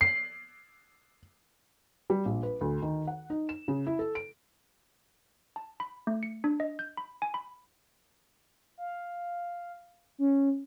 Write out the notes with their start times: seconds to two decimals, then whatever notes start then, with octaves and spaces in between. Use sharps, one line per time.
0.01 C7
2.10 G3
2.26 A#1
2.43 B4
2.61 D2
2.82 D#3
3.07 F#5
3.30 D#4
3.49 E7
3.68 C#3
3.87 E4
3.99 A4
4.15 D7
5.56 A5
5.80 B5
6.07 A3
6.23 C#7
6.44 D4
6.60 D#5
6.79 G6
6.97 B5
7.22 G#5
7.34 B5
8.77 F5
10.18 C#4